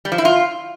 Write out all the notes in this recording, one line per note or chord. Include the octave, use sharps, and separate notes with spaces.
G3
F3
E4
F4